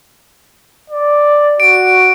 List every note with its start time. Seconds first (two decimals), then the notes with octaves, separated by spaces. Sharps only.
0.90 D5
1.60 F#4 D7